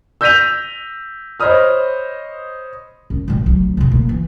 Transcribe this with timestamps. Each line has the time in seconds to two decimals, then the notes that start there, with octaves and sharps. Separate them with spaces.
0.21 E6 G6 A#6 B6 D#7 F7
1.40 C5 C#5 D#5 B5 D#6 F6
3.10 F#2
3.28 A#2 G3
3.46 D2 F#3
3.77 B2 D3
3.92 A#3
4.09 E3